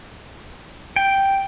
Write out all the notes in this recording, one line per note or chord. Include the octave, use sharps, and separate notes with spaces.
G5